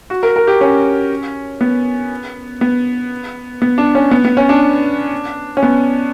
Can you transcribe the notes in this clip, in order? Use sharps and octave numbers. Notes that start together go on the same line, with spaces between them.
F#4
A#4
A#4
G4
C#4
B3
B3
B3
D4
C#4
B3
B3
C#4
D4
C#4
B3